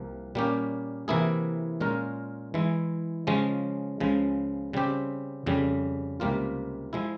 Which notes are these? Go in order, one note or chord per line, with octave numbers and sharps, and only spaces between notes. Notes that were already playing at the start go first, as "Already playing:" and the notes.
Already playing: C2 C3 F3 A#3
A#2 G3 A#3 C#4 G4
C3 E3 A#3 E4 G#4
A#2 G#3 C#4 F4 A#4
E3 G#3 E4
C#3 F3 G#3 C#4
C#2 C#3 F3 G#3
C#3 G3 C4 G4
F2 C#3 G3
C#2 C3 G3 A#3 F4
F3 G#3 E4